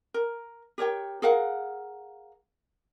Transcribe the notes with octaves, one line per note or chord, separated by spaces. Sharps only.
A#4
G4 A#4 C#5 G5
G#4 A#4 F5 F#5